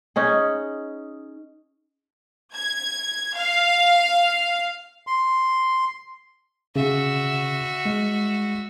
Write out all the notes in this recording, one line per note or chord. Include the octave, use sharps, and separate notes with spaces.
C#4 D#4 G#4
G#6
F5
C6
C#3 F#4 E5
G#3